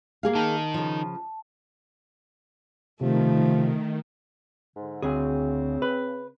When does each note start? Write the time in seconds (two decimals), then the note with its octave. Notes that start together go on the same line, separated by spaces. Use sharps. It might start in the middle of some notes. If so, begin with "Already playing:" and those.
0.23 A#3 G#4 F5
0.35 D#3 D#4 A5
0.74 C#3 F3
3.01 C3 D#3 F3 A3
4.76 G#2 D3
5.02 D2 C#3 C4 G#4
5.82 B4